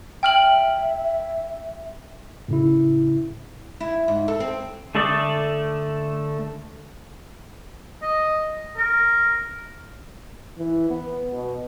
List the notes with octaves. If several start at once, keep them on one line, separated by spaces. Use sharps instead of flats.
E5 G5 F6 F#7
A2 C#3 E4
E4
G#2
A4
C4
D3 A3 A4 D5 D#6
D#5
A#4
E3
B3
B2